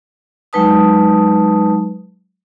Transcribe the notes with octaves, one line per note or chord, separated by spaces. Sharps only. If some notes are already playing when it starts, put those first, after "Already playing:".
F#3 G#3 D#4 B4 A5 D#6